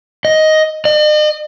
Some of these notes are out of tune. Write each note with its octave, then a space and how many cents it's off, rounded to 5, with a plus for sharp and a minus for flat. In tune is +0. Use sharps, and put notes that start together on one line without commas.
D#5 +5
D#5 -45